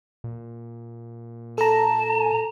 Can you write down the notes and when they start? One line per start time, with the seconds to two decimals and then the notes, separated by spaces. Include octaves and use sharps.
0.24 A#2
1.58 A4 A5 A#5